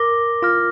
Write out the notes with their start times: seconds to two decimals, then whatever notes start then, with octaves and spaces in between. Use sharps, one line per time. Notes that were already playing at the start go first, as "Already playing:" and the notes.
Already playing: A#4 D6 A#6 G7
0.42 F4 D6 F6 A#6